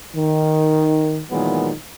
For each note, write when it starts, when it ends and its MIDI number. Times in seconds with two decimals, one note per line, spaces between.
0.16 1.19 51
1.31 1.71 46
1.31 1.71 51
1.31 1.71 52
1.31 1.71 54
1.31 1.71 56
1.31 1.71 59